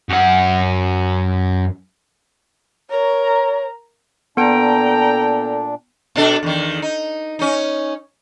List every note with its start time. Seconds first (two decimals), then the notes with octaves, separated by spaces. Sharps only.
0.09 F#2 F#5
2.90 A#4 C#5 A#5
4.37 A#2 B3 D4 A4 G5 A#5 D7
6.16 B2 D4 A4
6.43 E2 D#3
6.82 D#4
7.39 C#4 D#4